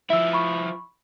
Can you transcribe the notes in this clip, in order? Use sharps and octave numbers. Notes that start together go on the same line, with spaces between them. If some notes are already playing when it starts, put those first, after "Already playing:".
F3 E4 E5 E6
B5 C#6